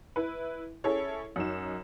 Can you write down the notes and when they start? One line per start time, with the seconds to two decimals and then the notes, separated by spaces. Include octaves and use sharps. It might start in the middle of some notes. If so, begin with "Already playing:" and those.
0.16 E4 B4
0.84 C#4 E4 G#4 A4 C#5
1.36 F#2 D#4 F#4 E7